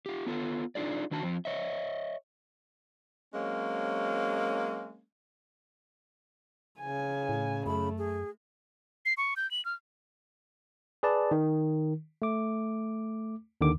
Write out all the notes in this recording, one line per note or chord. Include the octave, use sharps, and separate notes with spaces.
F4 G4
B3 F4 A4
D4 D#4 F4 G#4 D5
D#3 D4 F#4 A5
F2 F3 C4
C#5 D#5 E5
F#3 G#3 A#3 C4 C#4
C#3 G#5
A2
F#2 A3 B5
G#4
C7
C#6
G6
F#7
F6
G#4 B4 D5 A5
D#3
A3 D6
D#2 D3 D#3 D6